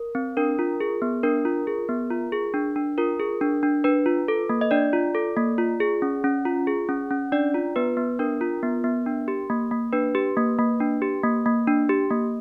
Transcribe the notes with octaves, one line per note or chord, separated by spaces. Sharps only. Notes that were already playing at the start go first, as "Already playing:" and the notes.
Already playing: A#4
C4
D4 A#4
F4
G#4
B3
D4 A#4
F4
G#4
B3
F4
G#4
D4
D4
F4 A#4
G#4
D4
D4
D4 B4
F4
A4
A#3
D#5
D4 D5
F4
A4
A#3
F4
G#4
C#4
C#4
F4
G#4
C#4
C#4
D4 D5
F4
B3 B4
B3
D4 A#4
F4
B3
B3
D4
G4
A#3
A#3
D4 B4
G4
A#3
A#3
D4
G4
A#3
A#3
D4
G4
A#3